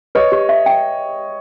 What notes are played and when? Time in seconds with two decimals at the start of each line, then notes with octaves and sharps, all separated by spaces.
0.15 B4 C#5 D#5
0.32 G4
0.49 E5
0.66 G5